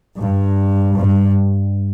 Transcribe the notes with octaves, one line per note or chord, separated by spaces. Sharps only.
G2
G2